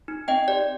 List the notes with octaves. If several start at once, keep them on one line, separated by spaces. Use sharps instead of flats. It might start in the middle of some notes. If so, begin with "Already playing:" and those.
D#4
C4 D#5 G5
G4 D5